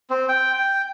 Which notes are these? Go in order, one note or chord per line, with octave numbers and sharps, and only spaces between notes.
C4
G5
G5